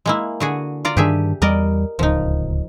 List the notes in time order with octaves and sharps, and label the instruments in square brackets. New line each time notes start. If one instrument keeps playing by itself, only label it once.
[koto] G#3 A#3 E4
D3 F#4 G#4
F4 D5 A#5
[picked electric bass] G2 D#3 D4 [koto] G4 G#4 E5
[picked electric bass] E2 G3 [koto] A#4 D5 D#5
[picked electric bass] D1 C#2 [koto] F3 D#4